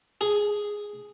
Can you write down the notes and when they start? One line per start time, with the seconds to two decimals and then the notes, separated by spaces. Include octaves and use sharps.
0.21 G#4